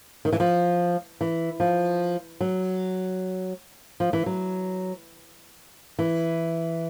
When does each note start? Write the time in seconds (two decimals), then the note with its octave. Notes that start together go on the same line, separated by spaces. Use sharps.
0.25 D#3
0.33 E3
0.40 F3
1.21 E3
1.60 F3
2.41 F#3
4.00 F3
4.13 E3
4.26 F#3
5.99 E3